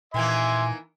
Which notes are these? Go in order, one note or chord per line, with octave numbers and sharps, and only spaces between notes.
A#2 D#3 E3 A#3 E5 G#5 C6